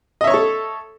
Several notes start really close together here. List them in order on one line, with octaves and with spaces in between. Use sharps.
D#5 E5 C#5 C#6 A4